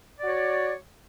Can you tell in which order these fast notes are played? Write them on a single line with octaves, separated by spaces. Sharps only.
D5 F#4 C#5